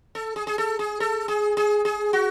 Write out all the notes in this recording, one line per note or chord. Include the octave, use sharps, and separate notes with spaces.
A4
G#4
G#4
A4
G#4
A4
G#4
G#4
G#4
F#4